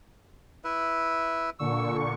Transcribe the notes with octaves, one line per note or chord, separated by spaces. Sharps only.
E4 B4 E5
A#2 D3 C#6 E6